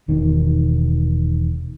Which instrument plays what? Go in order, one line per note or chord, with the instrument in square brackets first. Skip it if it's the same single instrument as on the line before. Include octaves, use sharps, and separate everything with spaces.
[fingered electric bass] E1 B2 D#3